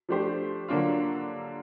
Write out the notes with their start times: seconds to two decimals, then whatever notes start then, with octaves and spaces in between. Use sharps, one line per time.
0.09 F3 A3 D4 G4 C5
0.68 D3 F#3 A#3 D4 F4